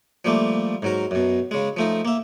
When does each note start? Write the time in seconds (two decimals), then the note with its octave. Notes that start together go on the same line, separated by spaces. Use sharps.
0.25 F3 G3 A3 A#3
0.82 G#2 F#3 A#4
1.11 F#2 B2
1.51 C#3 G#3
1.77 F3 A3 D#4
2.05 A#3 E5